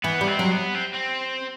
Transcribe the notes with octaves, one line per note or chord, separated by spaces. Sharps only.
E3 B3
G3
C4
F#3
B3
C4
C4